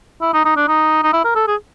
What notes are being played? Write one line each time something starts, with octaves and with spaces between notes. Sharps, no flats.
E4
D#4
D#4
D4
D#4
D#4
E4
A#4
A4
G#4